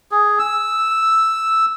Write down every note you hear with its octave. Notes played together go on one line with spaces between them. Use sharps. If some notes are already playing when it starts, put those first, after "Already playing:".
G#4
E6